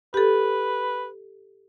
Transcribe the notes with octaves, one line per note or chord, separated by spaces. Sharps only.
G4 A4 B4